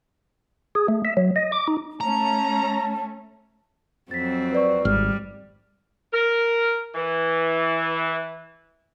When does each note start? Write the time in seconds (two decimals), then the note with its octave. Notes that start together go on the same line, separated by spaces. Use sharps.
0.75 G#4
0.88 A3
1.05 E5
1.17 F#3
1.36 D#5
1.52 D6
1.68 D#4
2.01 A3 C#4 A5 A#5
4.11 F2 F#3 C4 A6 B6
4.52 B4 D5 C#6
4.85 G#1 G3 F6
6.13 A#4
6.95 E3